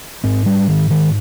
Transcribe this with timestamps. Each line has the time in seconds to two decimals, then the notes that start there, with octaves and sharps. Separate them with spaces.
0.24 G#2 C4
0.46 G3
0.68 D#3
0.91 D#3